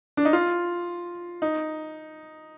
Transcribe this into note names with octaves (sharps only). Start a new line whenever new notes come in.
D4
D#4
F4
D#4